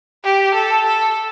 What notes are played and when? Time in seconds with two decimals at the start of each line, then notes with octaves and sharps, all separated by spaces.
0.24 G4
0.55 A4
0.86 A4